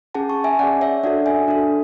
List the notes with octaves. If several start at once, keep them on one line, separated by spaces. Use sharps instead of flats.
C#4 G#4 F#5 A5
A5 C#6
E5 G#5
C#4 G#4 D5 F#5
C#5 E5
D4 F#4 A4 D5 F#5
E5 G#5
D4 F#4 A4